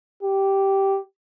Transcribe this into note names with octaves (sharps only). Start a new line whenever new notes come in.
G4